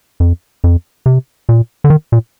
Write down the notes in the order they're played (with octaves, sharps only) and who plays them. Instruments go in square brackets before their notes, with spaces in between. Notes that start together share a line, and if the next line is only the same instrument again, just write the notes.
[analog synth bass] F2
F2
C3
A#2
D3
D#3
A#2